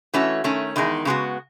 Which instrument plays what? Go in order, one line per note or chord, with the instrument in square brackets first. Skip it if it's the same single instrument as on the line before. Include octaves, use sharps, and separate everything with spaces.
[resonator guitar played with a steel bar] E3 A3 C#4 F#4
D#3 A3 C#4
E2 D#3 G#3 D#4
C#3 G#3 B3 F#4